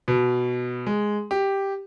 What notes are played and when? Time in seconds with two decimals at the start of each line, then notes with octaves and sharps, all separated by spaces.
0.08 B2
0.86 G#3
1.31 G4